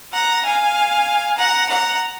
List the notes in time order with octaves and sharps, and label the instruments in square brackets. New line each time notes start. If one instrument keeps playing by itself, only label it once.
[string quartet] F#5 A#5
F5 G#5
F#5 A#5
F#5 A#5